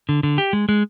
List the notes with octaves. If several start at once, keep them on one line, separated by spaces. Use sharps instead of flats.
D3
D3
G4
G#3
G#3